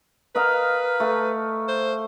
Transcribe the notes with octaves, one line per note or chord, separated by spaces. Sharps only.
A#4 B4 D#5 F5
A3
C5